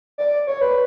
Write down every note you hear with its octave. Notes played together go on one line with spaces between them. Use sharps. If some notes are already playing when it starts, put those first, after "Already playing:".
D5
C#5
B4